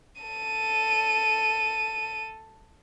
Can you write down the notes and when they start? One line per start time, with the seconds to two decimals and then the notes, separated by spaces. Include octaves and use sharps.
0.21 A4 D#7